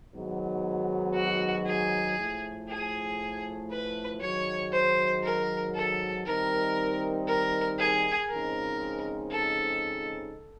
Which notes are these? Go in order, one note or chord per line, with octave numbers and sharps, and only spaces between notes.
G#2 D#3 F#3 B3
F#4
G#4
A2 F3 A3
G#4
B4
G#2 D#3 F#3 C#5
C5
A#4
A4
D#3 G3 C4 D#4 A#4
A#4
G#4
C#3 F3 G#3 C4 D#4 A#4
A4